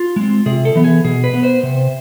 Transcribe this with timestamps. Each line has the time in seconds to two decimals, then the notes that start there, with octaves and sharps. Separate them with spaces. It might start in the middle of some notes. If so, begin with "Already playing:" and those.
Already playing: F4
0.16 G#3 C4
0.46 C3 G#4
0.65 A4
0.75 E3 B3
0.84 G#4
1.04 B2 G#4
1.24 B4
1.34 B3
1.43 C5
1.63 C3